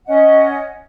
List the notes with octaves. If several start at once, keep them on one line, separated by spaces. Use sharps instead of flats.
C#4 D#5 F#5